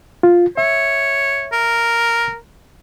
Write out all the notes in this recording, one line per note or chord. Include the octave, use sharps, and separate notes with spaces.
F4
C#5 E5
A#4